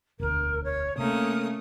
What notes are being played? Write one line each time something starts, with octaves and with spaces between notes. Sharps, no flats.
E1 D2 A#4
C#5
C3 A3 A#3 C#4 D#6